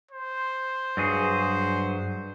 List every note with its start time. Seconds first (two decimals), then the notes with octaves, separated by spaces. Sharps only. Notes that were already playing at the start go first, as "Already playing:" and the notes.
0.11 C5
0.97 G2 F#3 G#4